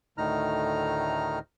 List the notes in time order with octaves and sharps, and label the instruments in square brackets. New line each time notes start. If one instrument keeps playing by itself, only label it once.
[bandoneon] D2 A2 D#3 D#4 A#5 F6